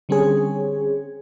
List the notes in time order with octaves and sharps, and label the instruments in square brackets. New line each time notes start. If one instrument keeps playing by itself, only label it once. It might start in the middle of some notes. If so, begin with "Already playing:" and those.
[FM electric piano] D3 G3 C4 C#4 G#4 C#5